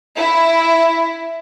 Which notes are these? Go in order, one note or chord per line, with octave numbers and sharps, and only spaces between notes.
E4